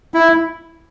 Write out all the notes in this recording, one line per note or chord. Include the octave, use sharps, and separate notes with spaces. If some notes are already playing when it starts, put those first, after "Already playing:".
E4